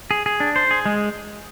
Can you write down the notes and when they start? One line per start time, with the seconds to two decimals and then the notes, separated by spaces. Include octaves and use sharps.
0.11 G#4
0.26 G#4
0.40 D4
0.56 C5
0.71 G#4
0.86 G#3